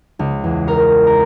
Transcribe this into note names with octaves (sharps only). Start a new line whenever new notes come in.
C#2
E2
A#4
A#5